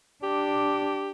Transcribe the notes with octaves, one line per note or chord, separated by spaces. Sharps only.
D4 G4